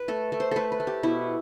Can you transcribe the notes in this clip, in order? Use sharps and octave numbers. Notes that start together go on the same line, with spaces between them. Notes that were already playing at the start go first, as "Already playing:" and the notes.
Already playing: B4
A3 A4
A3
C5
A3 A4 B4
B4
A3
G4
B2 E4